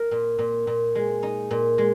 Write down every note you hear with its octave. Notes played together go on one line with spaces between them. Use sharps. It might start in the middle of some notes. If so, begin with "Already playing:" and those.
Already playing: A#4
A#2
A#2
A#2
G#3
D#4
A#2
G#3